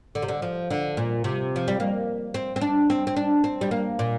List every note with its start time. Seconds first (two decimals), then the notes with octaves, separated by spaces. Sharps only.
0.15 D3
0.22 C3
0.28 D3
0.42 F3
0.70 D3
0.97 A#2
1.24 C3
1.56 F3
1.68 G3
1.80 A#3
2.34 C4
2.56 C4
2.61 D4
2.90 C4
3.07 C4
3.17 D4
3.44 C4
3.61 G3
3.71 A#3
3.99 A#2